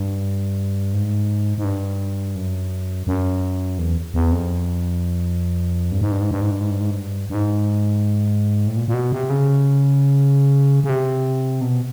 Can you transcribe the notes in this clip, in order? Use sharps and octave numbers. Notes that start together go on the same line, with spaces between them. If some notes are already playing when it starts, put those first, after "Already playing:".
Already playing: G2
G#2
G#2
G2
F#2
F#2
E2
E2
F2
G2
G#2
G2
G#2
G2
G#2
G2
G#2
G2
G#2
G2
G2
G#2
A2
A#2
A#2
B2
C3
C#3
C#3
C3
B2